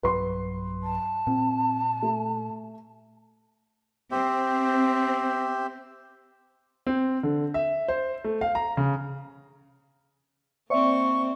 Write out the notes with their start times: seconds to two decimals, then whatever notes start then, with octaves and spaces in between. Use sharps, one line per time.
0.03 B1 G2 F#3 B4 C6
0.83 A5
1.27 A#2 C4
2.02 A3
4.11 C4 G4 C5 E5
6.87 C4
7.23 D3
7.54 E5
7.88 C5
8.24 A3
8.41 F5
8.55 A#5
8.77 C#3
10.70 A#3 C4 C5 D5 E5 C#6